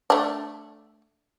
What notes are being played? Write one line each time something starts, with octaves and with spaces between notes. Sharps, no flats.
A3 D4